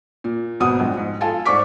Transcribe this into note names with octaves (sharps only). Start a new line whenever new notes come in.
A#2
G#1 B2 F#5 D#6
A#1 G#3
G#2
F4 A4 G#5 A5
G#2 C5 D5 C#6 D6 B6